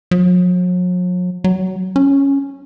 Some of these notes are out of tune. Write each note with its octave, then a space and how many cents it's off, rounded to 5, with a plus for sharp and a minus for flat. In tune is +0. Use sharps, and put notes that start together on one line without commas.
F#3 -45
F#3 +20
C#4 +0